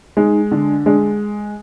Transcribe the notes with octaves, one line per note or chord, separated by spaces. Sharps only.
G#3 D#4
D3 D4
G#3 D4